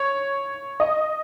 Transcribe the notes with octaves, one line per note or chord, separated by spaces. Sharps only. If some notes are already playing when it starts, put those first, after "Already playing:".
Already playing: C#5
D#5